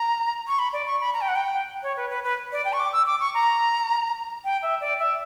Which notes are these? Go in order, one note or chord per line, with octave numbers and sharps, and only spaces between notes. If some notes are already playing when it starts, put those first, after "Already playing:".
Already playing: A#5
C#6
B5
D5
C#6
B5
A#5
G5
F#5
G5
C#5
B4
B4
B4
D5
G5
C#6
D6
E6
D6
C#6
A#5
G5
E5
D5
E5